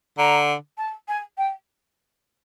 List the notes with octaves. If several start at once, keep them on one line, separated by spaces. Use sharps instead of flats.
D3 A#5
A5
G#5
G5